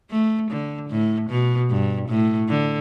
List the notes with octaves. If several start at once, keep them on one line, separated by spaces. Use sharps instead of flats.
A3
D3
A2
B2
G2
A2
D3